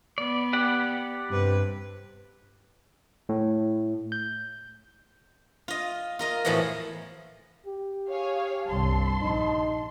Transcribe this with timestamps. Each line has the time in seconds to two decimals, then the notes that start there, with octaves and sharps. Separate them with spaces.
0.18 B3 D5
0.53 G4 D5 F#5
1.28 G2 C3 B4
3.29 A2
4.12 G6
5.68 F4 D#5
6.19 F4 A#4 D#5
6.45 E2 A2 E3 F3 F#4 D#5
7.66 G4
8.09 G#4 C#5 F5
8.67 G1 C2 A5 C6
9.22 A#1 D#4